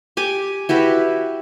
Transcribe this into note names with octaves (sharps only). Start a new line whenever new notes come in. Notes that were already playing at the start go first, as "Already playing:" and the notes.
G4 G#5 D6
E4 F#4 G4 B4